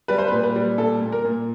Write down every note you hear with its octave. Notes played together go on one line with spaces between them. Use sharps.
G3 B4
C5
B4
A#2
B4
G3
A#2 A4
A#2
A#4
A#2